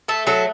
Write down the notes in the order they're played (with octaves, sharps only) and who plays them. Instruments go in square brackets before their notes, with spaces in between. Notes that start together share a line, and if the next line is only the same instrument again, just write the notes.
[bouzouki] A3 A4
F#3 A4